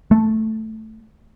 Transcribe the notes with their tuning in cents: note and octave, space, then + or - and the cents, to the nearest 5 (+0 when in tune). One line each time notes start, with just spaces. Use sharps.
A3 +0